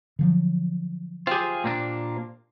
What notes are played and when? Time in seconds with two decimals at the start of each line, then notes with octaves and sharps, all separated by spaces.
0.19 D3 F3 F#3
1.27 C4 F4 G4 G#4
1.64 A#2 A#3 D4